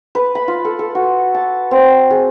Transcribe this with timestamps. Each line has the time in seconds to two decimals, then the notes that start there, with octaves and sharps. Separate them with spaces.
0.15 B4
0.35 B5
0.48 F4
0.65 A4
0.79 A4
0.95 F#4
1.34 A5
1.71 C4
2.11 G#4